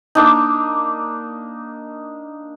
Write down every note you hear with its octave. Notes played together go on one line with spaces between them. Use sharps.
A#3 D4 D#4